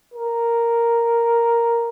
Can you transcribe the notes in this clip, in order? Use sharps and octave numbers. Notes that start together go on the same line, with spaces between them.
A#4